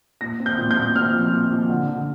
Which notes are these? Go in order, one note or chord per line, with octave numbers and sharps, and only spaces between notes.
A#2 A#6
C4
G6
A#2
G6
A#2
C4 F6
F3
A#2
F3
D3
D3